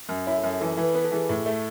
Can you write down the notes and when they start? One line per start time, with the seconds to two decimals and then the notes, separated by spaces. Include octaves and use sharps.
0.09 F#2
0.27 E4 C#5
0.38 A4
0.43 F#2
0.50 A4
0.61 E3 A4
0.72 B4
0.77 E3
0.84 B4
0.95 B3 B4
1.04 A4
1.12 E3 G#4
1.23 A4
1.29 A2
1.46 A3